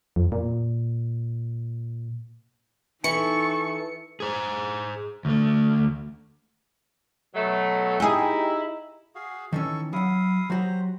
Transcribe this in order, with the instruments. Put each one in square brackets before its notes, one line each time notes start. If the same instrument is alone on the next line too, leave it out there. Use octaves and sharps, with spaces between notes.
[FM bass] F2
A#2
[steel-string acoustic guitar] E3 [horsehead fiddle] D#4 A4 [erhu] C#6 [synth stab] C#7
[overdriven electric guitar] G#4 C5
D2 A3
[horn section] B2 F#3 A3
[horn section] D#4 E4 [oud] G4 G#4
[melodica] F#4 G#4 F5
[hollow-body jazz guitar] D#3 E3 C#4 [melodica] A4 C#6 E6
[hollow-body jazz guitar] F#3 F#5 [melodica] E4 F5 D#6
[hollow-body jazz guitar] F#3 F#4 G4 [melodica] C5 A#5